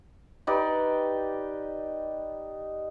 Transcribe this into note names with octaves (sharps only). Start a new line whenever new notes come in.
D#4 G4 B4 D5